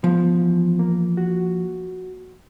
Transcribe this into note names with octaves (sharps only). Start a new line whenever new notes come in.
F3 B3
E3
A#3
F#4